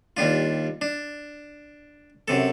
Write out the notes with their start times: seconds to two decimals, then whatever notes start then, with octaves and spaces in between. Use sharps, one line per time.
0.17 D#2 G3 D4 F4
0.81 D4
2.28 F#2 C3 A4